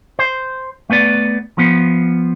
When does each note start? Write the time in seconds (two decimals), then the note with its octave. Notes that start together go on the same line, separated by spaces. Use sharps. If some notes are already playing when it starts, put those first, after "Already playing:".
0.19 C5
0.90 A3 B3 B4 D5
1.58 F3 B3